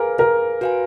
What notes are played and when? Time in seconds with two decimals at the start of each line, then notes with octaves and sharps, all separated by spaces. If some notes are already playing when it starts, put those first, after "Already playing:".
Already playing: G#4 A#4 B4 F5 G#5
0.19 A#4
0.61 F#4 B4 F5 G#5